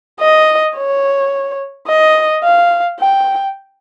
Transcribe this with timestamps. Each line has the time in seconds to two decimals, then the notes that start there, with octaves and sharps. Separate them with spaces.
0.20 D#5
0.76 C#5
1.88 D#5
2.43 F5
3.00 G5